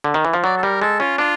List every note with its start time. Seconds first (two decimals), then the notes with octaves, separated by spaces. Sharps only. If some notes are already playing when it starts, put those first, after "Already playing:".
0.04 D3
0.14 D#3
0.25 E3
0.34 F3
0.44 F#3 D5
0.57 A4
0.63 G3 A#4
0.81 G#3 A4
1.00 C#4 F4
1.18 D4 F4